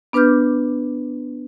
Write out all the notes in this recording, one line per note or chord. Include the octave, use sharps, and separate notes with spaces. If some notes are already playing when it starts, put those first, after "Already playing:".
B3 D4 B4 D6 F6 G6